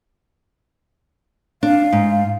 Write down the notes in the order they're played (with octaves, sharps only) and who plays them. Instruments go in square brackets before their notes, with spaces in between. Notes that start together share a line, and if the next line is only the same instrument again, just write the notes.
[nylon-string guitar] D4 [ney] F5
[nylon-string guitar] G#2